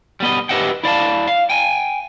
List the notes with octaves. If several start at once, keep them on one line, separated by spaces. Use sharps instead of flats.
G3 B3 D#5
G4 B4 D#5 E5 F#5 G5
E4 D5 F5 A5
F5
G5 G#5